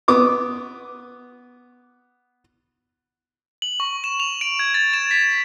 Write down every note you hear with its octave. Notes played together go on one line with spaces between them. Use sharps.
B3 D6 D#6
F#7
C#6
E7
F7
D7
G#6
A6
E7
B6